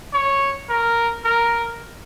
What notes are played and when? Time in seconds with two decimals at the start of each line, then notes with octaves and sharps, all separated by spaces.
0.13 C#5
0.69 A#4
1.25 A#4